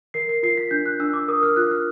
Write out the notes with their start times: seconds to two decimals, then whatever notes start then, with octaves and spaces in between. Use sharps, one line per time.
0.14 A#4 C7
0.29 C7
0.43 F4 C7
0.57 B6
0.71 D4 G6
0.86 F#6
1.00 D4 E6
1.13 D6
1.28 A#4 D#6
1.43 F6
1.56 F4 F#6
1.71 F6